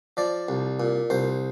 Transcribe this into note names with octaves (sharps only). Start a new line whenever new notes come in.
F3 D5
C2
A#2
C2 C5